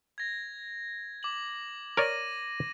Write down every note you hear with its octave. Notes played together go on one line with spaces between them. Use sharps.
G#6 A#6
D6 F#7
A#4 C#5 D5 A#6 D#7